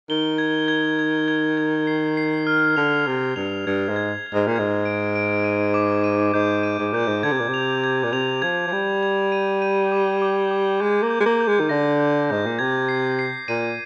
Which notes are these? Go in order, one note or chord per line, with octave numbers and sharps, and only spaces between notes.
D#3 G7
G#6
G#6
G#6
G#6
G#6
C7
C7
F6
D3 F7
C3 F6
G2 F7
G2 G#6
G#2
G#6
G#6
G#2
A#2
G#2 G#6
D7
D7
D#7
D6
D#7
G#2 G6
D#7
G#2
A#2 G6
G#2
D3 G#6
C3
A#2
C3
F7
G#6
A#2
C3 F7
F3 G#6
F3
G3 G#6
G#6
D#7
D#7
D6
D6
D6
G#3 G6
A#3
G6
G#3
A#3
G6
G#3
D#3
D3 A#6
G6
G#2 G6
A#2
C3 G#6
C7
C7
A#2 D#7